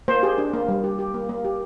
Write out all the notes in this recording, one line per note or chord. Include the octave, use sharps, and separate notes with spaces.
A#3 C5
G4 G#4
D4
A#3
G3
G4
G4
A#3
A#3
G4